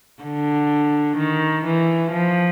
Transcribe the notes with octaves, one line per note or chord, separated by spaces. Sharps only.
D3
D#3
E3
F3